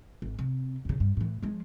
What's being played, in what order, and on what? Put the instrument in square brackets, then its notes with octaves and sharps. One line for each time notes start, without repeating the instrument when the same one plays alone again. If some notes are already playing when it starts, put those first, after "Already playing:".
[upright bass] G#1
C3
F2 C#3
G2
A2 E3
F3 G#3